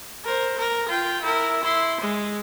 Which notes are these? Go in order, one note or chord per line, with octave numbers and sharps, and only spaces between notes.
A#4 C5
A#4
F4 G5
E4 A#4
E4 C6
G#3